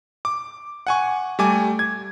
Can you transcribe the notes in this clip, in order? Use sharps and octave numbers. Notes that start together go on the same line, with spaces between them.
D6
F#5 G#5 C#6
G3 A3 G#5 D6
G#6